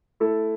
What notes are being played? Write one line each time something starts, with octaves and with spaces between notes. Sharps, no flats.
A3 E4 A4